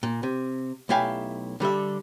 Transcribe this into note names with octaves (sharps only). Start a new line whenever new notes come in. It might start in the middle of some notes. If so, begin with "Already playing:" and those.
A#2
C3
B1 A3 E4 G4 F5 G#5
D3 G3 A4 E5